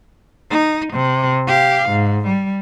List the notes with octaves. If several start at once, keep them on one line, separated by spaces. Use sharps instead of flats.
D#4
C3
G4 F5
G#2
G3